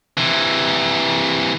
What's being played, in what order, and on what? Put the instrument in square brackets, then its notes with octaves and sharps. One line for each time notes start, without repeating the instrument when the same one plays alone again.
[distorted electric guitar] C3 E3